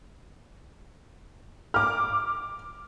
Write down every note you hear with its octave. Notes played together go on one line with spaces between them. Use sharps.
D6 F6